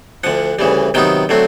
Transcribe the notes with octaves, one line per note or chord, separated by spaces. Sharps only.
D2 D3 F3 F#5
D2 C#3 E3 G3
C3 D#3 F#3 B3 D#4 G5
D3 F#3 A3 C4